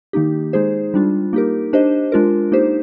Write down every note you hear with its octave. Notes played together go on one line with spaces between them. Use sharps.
D#3 A#3 D#4 G4
G#3 D#4 G#4 C5
G3 D4 F4
A#3 D#4 G4 A#4
D4 G4 C5 D#5
G#3 D4 F4 A#4
A#3 D#4 G4 C5